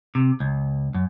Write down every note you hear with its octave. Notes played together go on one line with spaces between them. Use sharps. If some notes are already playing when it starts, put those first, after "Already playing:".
C3
C#2
F#2